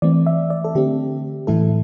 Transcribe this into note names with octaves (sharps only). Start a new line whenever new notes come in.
E3 A3 C4 D5
E5
D5
A4
D3 A3 C4 G4
A2 E3 A3 E4 A4